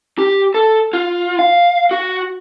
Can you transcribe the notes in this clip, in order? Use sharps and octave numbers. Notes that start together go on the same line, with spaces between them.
G4
A4
F4
F5
F#4